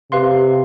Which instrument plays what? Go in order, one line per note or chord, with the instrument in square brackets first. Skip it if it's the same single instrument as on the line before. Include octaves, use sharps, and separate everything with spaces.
[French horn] C3 [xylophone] G4 B4 F5 C6